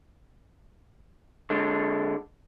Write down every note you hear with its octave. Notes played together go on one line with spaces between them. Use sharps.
D3 G#3